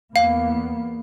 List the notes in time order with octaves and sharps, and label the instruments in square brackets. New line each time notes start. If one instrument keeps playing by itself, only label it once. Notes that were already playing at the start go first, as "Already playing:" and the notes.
[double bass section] E2 A#3 B3 [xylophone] F5